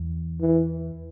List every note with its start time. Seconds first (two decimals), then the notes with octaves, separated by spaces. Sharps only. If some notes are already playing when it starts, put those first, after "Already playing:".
Already playing: E2
0.41 E3